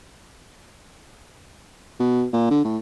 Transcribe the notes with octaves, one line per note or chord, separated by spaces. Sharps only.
B2
A#2
D3
A2